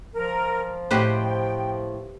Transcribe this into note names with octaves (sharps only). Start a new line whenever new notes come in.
F3 A#4
A2 G4 B4 C5 D#5 F#5 G5